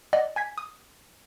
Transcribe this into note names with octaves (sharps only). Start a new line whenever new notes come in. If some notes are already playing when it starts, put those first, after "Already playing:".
D5 D#5 F#5
G#5 G#6 B6
D#6